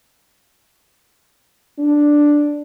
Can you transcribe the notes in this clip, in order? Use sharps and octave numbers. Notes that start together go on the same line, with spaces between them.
D4